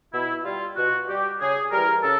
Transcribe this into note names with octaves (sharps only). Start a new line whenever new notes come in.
B2 E4
G3 F4
B2 F#4
G3 G4
C#3 G#4
E3 G3 A#4
C#3 A4